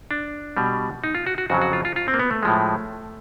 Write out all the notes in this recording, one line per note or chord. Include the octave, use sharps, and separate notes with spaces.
D4
B2 G3
D#4
F4
F#4
F#4
F2 C#3 F#3 F#4
F#4
F4
F4
F4
C4
A#3
B3
A3
A2 F3 G#3